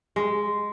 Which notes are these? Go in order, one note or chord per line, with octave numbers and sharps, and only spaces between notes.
G#3